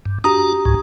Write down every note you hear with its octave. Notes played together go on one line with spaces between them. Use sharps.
G2
D4 F#4 G4 A#5 D#6
C#2 G#2